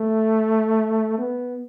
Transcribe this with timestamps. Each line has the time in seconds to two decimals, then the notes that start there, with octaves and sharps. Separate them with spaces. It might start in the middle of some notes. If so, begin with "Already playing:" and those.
Already playing: A3
1.18 B3